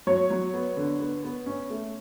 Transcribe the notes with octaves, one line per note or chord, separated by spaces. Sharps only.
F#3 C#5
F#3
B3
D3
B3
B3
C#4
A3